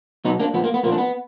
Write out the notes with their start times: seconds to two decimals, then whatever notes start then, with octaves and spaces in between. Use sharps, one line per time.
0.25 B2 F#3 B3 D#4
0.40 A#3 D4
0.54 A#2 F3 B3
0.64 A#3
0.74 B3
0.83 A#2 F3 A#3
0.92 D4
0.98 B3